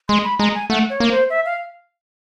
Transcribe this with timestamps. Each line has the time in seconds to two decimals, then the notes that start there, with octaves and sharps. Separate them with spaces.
0.09 G#3 C6
0.24 B5
0.39 G#3 A#5
0.55 G#5
0.70 A3 F#5
0.90 C#5
1.00 A#3
1.10 C5
1.30 E5
1.45 F5